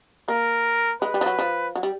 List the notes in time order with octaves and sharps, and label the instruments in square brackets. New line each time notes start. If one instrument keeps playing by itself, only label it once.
[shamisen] A#3 [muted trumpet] A#4
[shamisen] G#3 [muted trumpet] B4
[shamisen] G3
F3
F#3
F3
F#3
G3